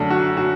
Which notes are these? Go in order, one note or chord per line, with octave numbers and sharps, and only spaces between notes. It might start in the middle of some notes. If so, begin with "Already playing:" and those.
Already playing: F#2 D3 A3 D4
F#4
F#4